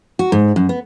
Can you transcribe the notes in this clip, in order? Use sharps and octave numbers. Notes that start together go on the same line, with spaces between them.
F#4
G#2
F#2
B3